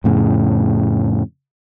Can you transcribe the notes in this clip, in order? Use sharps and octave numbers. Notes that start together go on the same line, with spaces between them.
F2 A2 C#3